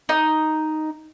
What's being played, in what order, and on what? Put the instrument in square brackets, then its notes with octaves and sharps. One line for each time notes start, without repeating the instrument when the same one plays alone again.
[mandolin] D#4